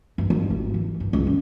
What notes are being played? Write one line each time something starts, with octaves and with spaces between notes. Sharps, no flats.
G2
D#2
G#1
E3
G2
C#2
A#2